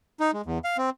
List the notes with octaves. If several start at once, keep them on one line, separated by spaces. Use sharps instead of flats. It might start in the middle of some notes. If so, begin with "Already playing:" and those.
D#4
G#3
E2
F5
C4